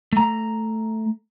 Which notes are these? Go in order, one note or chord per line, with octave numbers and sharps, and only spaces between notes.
A3 A#5